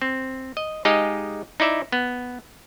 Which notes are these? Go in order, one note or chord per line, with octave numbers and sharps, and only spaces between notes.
C4
D#5
G#3 D#4 G4 G#4 D#5 F5
D#4 E4 D5 E5
B3